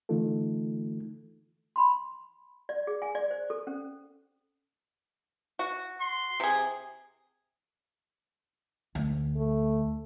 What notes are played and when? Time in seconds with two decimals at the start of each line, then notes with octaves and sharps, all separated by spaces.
0.09 D3 E3 A3 D#4 F4 A4
1.76 B5 C6
2.69 D5
2.87 G#4
3.02 G#5
3.15 D5
3.31 C5
3.50 A4
3.67 C#4
5.59 F#4
6.01 C6
6.40 C3 G#4
8.95 D2
9.36 A3